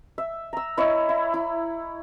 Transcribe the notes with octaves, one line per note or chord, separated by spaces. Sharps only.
E5
A#5 E6
E4 C#5 D#5
E4
E4